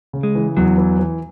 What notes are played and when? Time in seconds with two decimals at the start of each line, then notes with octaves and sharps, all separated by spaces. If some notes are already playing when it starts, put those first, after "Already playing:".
0.13 C#3
0.23 G#3
0.35 E3
0.57 E2 F#3
0.78 E3
0.99 E3